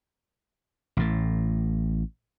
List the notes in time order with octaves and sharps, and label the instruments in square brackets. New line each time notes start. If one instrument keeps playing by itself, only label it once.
[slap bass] A1 A2